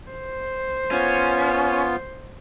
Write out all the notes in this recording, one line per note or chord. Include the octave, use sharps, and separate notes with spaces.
C5
B3 C#4 F4